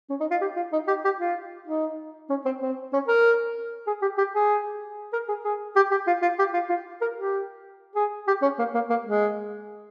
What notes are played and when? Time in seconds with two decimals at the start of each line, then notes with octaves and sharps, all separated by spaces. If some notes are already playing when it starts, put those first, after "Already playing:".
0.10 C#4
0.20 D#4
0.31 F4
0.41 G4
0.56 F4
0.72 D#4
0.88 G4
1.05 G4
1.19 F4
1.67 D#4
2.29 C#4
2.45 C4
2.62 C4
2.93 C#4
3.08 A#4
3.87 G#4
4.02 G4
4.18 G4
4.34 G#4
5.13 A#4
5.28 G#4
5.44 G#4
5.76 G4
5.91 G4
6.07 F4
6.22 F4
6.39 G4
6.53 F4
6.69 F4
7.01 A#4
7.17 G4
7.95 G#4
8.27 G4
8.42 C#4
8.59 A#3
8.74 A#3
8.90 A#3
9.05 G#3